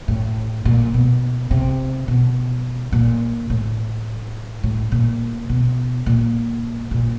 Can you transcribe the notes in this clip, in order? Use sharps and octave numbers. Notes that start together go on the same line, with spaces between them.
A2
A#2
B2
C3
B2
A#2
A2
A2
A#2
B2
A#2
A#2